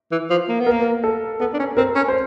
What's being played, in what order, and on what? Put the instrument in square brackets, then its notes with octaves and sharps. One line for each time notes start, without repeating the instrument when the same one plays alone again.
[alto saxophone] E3
F3
A#3
B3
[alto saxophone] A#3 [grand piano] A#4
[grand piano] A4
[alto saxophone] B3 [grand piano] A4
[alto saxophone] D4
C#4
[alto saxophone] C4 [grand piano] A#4
[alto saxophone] C#4
[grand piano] C5